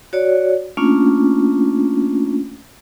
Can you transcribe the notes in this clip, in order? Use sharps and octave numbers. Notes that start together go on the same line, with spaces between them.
F#4 C#5 D5
A3 A#3 C#4 D4 F4